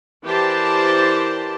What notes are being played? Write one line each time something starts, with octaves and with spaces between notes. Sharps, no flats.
E3 G4 A#4 C5 D5 A5